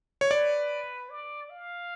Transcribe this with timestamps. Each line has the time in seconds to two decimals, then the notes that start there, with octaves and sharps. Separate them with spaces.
0.21 C#5
0.31 B4 D5
1.10 D5
1.50 F5